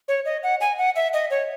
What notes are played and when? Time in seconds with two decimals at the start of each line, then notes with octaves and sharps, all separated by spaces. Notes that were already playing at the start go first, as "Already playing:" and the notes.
0.08 C#5
0.25 D#5
0.43 F#5
0.61 G#5
0.78 F#5
0.96 E5
1.13 D#5
1.31 C#5